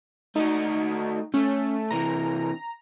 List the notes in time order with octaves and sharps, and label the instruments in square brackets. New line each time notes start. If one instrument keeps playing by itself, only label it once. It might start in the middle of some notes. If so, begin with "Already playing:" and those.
[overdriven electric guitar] A3 F#4 [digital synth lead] D#4
[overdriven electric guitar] A3 [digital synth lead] C#4
[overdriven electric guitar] C3 E3 [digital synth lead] A#5